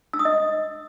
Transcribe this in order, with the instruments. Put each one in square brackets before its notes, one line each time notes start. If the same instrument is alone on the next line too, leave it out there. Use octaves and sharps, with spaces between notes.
[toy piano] E6
D#6
D#5